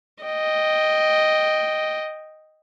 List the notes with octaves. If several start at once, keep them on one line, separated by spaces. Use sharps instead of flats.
D#5 G5